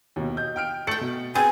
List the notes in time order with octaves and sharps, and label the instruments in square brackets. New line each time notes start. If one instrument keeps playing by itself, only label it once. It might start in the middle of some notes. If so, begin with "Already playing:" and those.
[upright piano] D#2 B2
D#5 G6
G5 F6 D7
[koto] A3 G5 [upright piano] A6 C#7 F#7
[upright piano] B2
[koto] B3 C4 G#4 [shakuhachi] G#5 [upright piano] A6